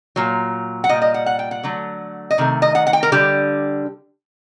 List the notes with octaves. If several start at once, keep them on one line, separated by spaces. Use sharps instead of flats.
A#2 F#3
F#5
A#2 G3 D#5
D#5
F#5
F#5
G5
F#5
D3 F#3 A3
D#5
C3 D#3 A3
D#5
F#5
F#5
G5
A#4
D3 G3 G4